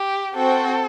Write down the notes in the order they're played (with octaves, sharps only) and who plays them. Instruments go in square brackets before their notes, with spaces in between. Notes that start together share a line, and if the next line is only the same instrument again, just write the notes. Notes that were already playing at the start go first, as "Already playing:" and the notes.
Already playing: [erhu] G4
[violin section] C4 F#4 C5 G5 [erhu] A4